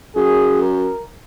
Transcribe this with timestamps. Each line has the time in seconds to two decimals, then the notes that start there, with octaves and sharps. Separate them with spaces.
0.16 F#2 G#4
0.61 A#4